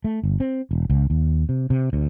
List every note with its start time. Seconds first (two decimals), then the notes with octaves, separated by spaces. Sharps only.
0.04 A3
0.24 G1
0.40 C4
0.71 E1
0.90 C#2
1.10 D#2
1.49 C3
1.70 C3
1.93 D2